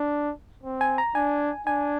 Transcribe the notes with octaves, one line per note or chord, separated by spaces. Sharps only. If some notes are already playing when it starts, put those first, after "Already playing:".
Already playing: D4
C4
G#5
A#5
D4 G#5
D4 G#5